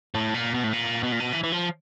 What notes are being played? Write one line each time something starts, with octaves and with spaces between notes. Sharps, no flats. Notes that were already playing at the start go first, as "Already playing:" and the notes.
A2
A#2
B2
A2
A#2
B2
A#2
B2
E3
E3
F3